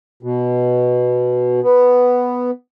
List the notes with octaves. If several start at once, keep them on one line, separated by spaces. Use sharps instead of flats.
B2
B3